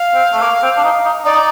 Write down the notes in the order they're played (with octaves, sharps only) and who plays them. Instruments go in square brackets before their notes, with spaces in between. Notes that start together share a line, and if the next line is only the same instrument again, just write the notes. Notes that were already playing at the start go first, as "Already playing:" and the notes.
Already playing: [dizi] F5
[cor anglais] C4
A3
A#3
C4
D4
D#4
D#4
[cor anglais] D#4 [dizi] D5